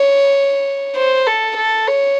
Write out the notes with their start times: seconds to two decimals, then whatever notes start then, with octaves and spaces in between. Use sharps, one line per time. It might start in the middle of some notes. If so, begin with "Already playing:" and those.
Already playing: C#5
0.95 C5
1.27 A4
1.57 A4
1.88 C#5